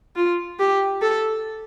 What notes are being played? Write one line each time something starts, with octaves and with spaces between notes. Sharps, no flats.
F4
G4
A4